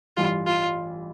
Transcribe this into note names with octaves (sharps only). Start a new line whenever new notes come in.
A1 G2 E3 G3 F4
F4